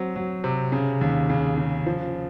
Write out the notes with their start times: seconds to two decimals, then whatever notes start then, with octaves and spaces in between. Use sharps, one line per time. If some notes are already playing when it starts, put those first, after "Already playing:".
Already playing: F#3 C4
0.16 F#3
0.44 C3
0.72 C#3
1.01 D#2
1.30 C#3
1.57 C#3
1.86 F3